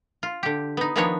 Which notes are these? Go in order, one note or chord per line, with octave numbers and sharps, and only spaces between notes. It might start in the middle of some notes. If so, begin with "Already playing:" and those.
F4
D3 G4
B3 D#4
D#3 F3 B3 D4 D#4 C#5